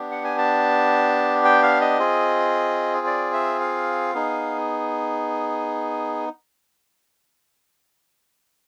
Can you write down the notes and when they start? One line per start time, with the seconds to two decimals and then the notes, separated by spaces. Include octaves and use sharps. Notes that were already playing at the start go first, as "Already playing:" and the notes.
Already playing: B3 D4 G4
0.11 F#5
0.24 G#5
0.38 A5
1.45 G5
1.63 F5
1.81 D#5
1.99 C4 F4 G#4
3.07 D5
3.33 E5
3.61 F5
4.14 B3 D#4 G#4